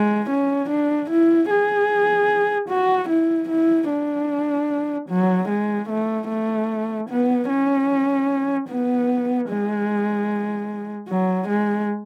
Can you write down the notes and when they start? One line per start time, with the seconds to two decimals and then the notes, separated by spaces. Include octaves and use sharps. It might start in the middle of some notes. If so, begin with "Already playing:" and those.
Already playing: G#3
0.29 C#4
0.69 D4
1.10 E4
1.50 G#4
2.69 F#4
3.09 E4
3.49 E4
3.89 D4
5.09 F#3
5.48 G#3
5.89 A3
6.28 A3
7.09 B3
7.49 C#4
8.69 B3
9.48 G#3
11.08 F#3
11.48 G#3